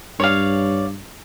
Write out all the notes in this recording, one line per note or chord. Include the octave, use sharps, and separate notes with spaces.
G2 C#5 D5 F5